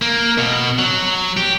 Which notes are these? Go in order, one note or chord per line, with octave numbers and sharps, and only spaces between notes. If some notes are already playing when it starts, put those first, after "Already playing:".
A#3
B2
F#3
G4